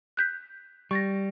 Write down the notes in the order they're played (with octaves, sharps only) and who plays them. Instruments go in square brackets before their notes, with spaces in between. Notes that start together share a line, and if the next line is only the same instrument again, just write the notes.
[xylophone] F#6 G6 B6
[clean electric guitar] G3 [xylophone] C#6 A6 A#6